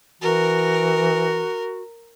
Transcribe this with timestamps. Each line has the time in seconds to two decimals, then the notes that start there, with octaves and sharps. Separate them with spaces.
0.22 E3 F#4 A#4